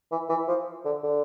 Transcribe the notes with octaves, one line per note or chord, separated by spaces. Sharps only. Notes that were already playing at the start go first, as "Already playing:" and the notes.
E3
E3
F3
D3
D3